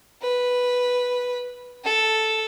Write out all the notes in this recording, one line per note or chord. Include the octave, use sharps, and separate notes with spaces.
B4
A4